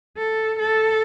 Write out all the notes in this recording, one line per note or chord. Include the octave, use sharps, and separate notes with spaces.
A4
A4